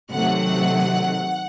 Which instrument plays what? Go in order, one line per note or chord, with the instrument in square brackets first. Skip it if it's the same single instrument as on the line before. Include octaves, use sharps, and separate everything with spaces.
[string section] C3 D#3 F#3 A3 F#5